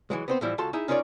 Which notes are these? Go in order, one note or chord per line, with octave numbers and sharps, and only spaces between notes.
E3 F#3 G#3
B3 C4 C5
A2 E3 F3 G3 E4
C#2 F4 F#4 A4 A5 C6
D#4 E4 G#4 E5
C#4 D#4 F4 A#4 C#5 D5